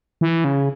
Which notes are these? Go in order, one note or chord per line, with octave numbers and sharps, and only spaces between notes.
E3
C#3